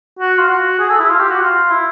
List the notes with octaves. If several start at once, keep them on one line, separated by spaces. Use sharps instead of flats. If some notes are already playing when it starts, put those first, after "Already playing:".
F#4
F4
F#4
G#4
A4
E4
F4
G4
F#4
F4
E4